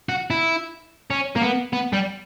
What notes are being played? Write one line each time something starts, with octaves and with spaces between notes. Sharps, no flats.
F#4
E4
C#4
A#3
B3
B3
G3